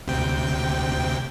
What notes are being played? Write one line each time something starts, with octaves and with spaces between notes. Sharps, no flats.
D2 C3 G5